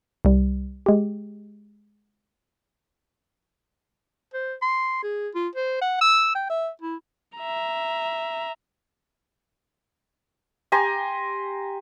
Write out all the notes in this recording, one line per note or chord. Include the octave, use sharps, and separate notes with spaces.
C2 G3
G#3 G4
C5
C6
G#4
F4
C5
F#5
E6
G5
E5
E4
E5 A#5
G4 G#5 A#5 C6